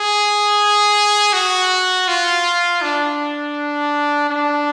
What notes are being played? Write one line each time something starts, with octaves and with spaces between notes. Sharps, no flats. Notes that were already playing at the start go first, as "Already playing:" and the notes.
Already playing: G#4
F#4
F4
D4
D4